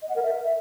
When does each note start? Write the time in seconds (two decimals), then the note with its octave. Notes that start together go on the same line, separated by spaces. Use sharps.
0.02 D#5
0.09 F#5
0.16 A#4
0.22 E5